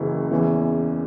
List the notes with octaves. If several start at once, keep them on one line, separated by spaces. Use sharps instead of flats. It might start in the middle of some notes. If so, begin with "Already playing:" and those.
Already playing: F#1 F#2 C#3 E3
E2 C#3 E3